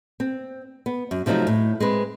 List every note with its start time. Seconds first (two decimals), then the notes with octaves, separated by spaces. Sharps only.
0.20 C4
0.86 B3
1.11 F#2
1.26 C3 F3 F#3 A3 D#4
1.47 A2
1.80 G#3 C4 B4